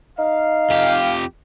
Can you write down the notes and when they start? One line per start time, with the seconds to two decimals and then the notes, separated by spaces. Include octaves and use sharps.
0.19 D#4 F5
0.70 F2 G4